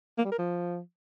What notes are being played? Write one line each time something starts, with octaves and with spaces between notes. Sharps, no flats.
A#3
G3
A#4
F3